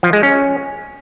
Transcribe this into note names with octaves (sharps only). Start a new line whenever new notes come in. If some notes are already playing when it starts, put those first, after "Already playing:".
F3
G#3
C#4